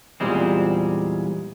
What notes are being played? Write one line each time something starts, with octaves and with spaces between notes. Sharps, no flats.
E2 G2 A#2 G3 G#3 C4